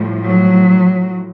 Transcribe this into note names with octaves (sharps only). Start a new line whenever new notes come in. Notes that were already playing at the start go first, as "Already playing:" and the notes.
Already playing: A2 F3 G3
F#3